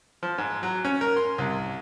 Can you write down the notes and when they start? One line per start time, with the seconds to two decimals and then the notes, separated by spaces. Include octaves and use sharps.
0.23 F3
0.38 G#2
0.63 F#3
0.85 C#4
1.01 A#4
1.16 C6
1.38 C2